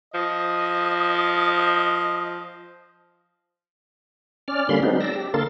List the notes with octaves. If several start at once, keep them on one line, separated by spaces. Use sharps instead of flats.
F3 D#5
C#4 D5 F6
D3 G3 A#3 C#4 B5 C6
F#3 G#3 B3 C4 D4 D#4
D5 E6 A#6
G4
D3 A#3 A4 A#4 C6 A6